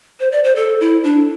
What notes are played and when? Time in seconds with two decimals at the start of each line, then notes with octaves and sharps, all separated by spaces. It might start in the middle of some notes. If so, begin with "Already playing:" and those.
0.20 C5
0.32 D5
0.44 C5
0.56 A4
0.80 E4
1.04 D4